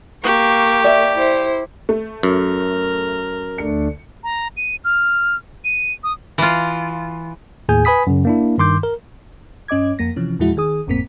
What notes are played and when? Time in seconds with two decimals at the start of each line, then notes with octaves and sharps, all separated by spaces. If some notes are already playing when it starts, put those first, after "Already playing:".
0.24 A#3 G4 C#6
0.84 D5 E5
1.14 E4 C5
1.89 A3
2.23 F#2 A#4
3.58 D2 A3 D4 C#7
4.24 A#5
4.57 D#7
4.84 F6
5.65 D#7
6.04 D#6
6.38 E3 F4
7.69 D#2 A2 G#4 G#5 G6
7.85 B4 G#5 B5 D#6 B6
8.07 F#2 C#3
8.25 A#3 D4 E4
8.58 G2 D#3 C6 D6 G6
8.83 A#4
9.68 G2 C#4 D#5 D6 G#6
9.99 F2 A#3 A#6
10.16 C3 E3 F3 C#4
10.39 E2 A#2 F3 G#3 E4 F#4
10.57 D#3 G#4 D#6
10.87 G1 F2 A2 A#3 C4 B6